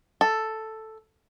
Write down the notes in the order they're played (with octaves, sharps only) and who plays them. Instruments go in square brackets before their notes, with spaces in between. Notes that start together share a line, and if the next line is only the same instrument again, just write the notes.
[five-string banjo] A4